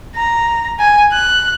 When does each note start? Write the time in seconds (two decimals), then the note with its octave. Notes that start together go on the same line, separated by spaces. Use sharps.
0.16 A#5
0.79 G#5
1.12 F#6